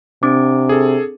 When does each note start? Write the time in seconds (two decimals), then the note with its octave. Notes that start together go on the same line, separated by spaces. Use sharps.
0.23 C3 C4 D4 D6
0.69 G#4 A4